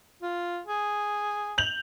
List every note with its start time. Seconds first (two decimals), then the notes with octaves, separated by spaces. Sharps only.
0.22 F4
0.66 G#4
1.58 G6 F7 F#7